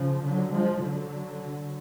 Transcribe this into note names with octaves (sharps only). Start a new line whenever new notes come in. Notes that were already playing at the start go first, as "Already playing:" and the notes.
Already playing: C#3 F3
D3 F#3
F3 G#3
D3 F#3